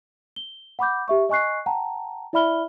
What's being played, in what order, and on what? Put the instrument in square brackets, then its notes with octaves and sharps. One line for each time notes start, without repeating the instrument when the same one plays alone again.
[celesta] G7
F#5 B5 D6 G6
G4 E5 C#6
D#5 G#5 C#6 F#6 C7
F#5 G5 A5 A#5
E4 D5 E5 B5 F6 G7